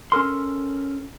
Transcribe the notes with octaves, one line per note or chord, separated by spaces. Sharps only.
C#4 A4 A#4 C6